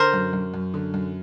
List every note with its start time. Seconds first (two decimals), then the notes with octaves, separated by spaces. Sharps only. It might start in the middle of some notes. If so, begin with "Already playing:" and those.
Already playing: D3 A#4 C5
0.13 F#2
0.33 F#2
0.54 F#2
0.74 D3
0.94 F#2